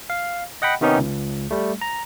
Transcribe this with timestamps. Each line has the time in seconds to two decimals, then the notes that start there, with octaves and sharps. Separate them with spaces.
0.10 F5
0.62 D#5 F#5 G5 B5
0.81 C3 D#3 B3 C#4 D#4 G4
0.98 C#2
1.51 G3 A3
1.81 A#5